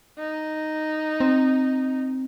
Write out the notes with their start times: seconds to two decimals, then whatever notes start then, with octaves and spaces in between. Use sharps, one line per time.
0.18 D#4
1.20 C4